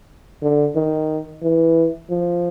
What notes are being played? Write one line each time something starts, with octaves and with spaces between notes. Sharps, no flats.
D3
D#3
E3
F3